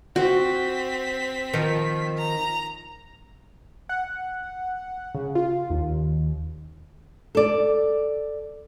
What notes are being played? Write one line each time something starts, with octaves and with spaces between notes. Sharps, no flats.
C4 F#4 B6
D#3 F3
A#5
F#5
C#3
F4
D#2
A4 D5